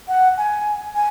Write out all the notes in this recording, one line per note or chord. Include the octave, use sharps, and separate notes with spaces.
F#5
G#5
G#5